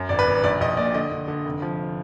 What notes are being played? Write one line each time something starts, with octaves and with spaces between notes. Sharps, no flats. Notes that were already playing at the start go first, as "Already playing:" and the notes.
Already playing: F#2
G#1 D5
B4
G#1
A#1 D5
A#1 D#5
A#2 D5
D3 D#5
D3
D3
F1
F3